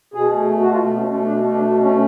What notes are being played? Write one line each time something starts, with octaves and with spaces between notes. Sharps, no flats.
B2 G#4
A3
B2
F#4
A3 F4
B2 B3
C#4
A3
B2 D4
A3
D4
B2
A3 C#4